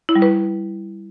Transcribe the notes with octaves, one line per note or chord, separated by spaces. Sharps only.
E4
G3
B4